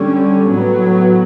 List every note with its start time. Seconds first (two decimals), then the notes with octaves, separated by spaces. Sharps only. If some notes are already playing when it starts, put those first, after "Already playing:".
Already playing: D3 G3 C#4
0.50 A2 F#3 B3